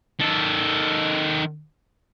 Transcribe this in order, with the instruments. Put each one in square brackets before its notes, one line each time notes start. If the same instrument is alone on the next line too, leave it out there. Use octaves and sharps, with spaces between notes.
[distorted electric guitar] D#3 A4